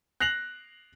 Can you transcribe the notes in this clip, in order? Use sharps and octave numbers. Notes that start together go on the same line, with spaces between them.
F#6 A#6 C7 F7 F#7